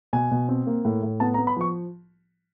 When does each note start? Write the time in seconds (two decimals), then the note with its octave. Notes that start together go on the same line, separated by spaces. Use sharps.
0.13 B2 G#5
0.31 B2
0.49 C4
0.67 A#3
0.85 A2
1.03 A2
1.20 B3 A5
1.34 A#5
1.39 B3
1.47 B5
1.57 F3 C#6